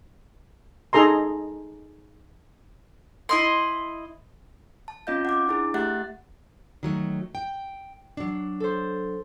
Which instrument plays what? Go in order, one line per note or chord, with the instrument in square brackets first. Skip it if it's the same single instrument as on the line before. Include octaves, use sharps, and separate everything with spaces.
[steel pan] D#4 G#4 A4 A#5 C6
[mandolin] E4 D#5 C6
[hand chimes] A5
C4 C#4 F4 D#5 F5 G6
F#5 D6
D4 E4 G#4
A3 G4 E5 F#5 F#6 A6
[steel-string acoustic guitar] D#3 F#3 A3
G5
F#3 D4
[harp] A4 C5